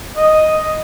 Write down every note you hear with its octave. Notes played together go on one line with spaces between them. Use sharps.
D#5